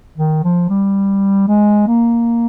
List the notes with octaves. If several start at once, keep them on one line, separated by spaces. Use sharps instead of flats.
D#3
F3
G3
G#3
A#3